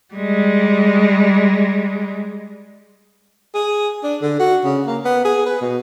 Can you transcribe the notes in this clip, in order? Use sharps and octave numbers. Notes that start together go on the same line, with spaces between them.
G3 G#3
G#4
D4
D3
F#4
C#3
A#3
B3
G#4
B4
B2